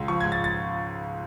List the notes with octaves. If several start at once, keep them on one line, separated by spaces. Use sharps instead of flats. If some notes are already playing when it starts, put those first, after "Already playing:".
Already playing: C#2
F3 C#6
G#2 G#6
A6
A6